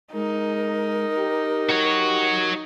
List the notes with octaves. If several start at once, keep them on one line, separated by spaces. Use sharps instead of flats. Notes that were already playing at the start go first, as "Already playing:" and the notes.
G#3 D#4 A#4
G4
F#4 C#5